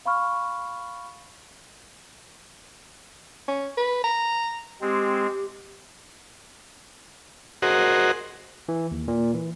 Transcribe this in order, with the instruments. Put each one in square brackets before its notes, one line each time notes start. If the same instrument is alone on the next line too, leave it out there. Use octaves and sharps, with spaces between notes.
[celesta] F5 B5 C#6 F6
[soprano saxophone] C#4
B4
A#5
[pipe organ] G#3 C4 [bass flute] G4
[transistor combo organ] F#4 G#4 A#4 C5 D#5 F#5
[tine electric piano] E3
D#2
A#2
E3